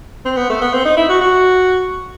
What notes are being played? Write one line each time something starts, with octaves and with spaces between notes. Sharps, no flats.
C4
B3
A3
B3
C4
D#4
E4
F#4
F#4